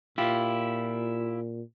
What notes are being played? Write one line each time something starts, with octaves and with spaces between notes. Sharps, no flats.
A#2 E4 F4 G4